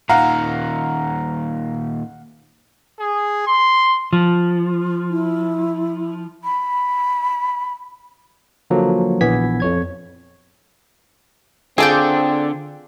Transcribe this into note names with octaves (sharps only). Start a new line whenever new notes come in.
A#2 D#3 F5 F#5 A#5
G#4
C6
F3
E4
B5
D3 F3 F#3 A#3
A#1 E3 B3 G#6 B6
F2 C#5 G#6
D3 C4 D4 F4 G#4 A4 D5 G6